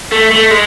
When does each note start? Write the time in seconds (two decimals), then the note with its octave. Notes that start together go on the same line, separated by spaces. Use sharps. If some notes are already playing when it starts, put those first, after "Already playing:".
0.12 A3
0.31 A3
0.51 G#3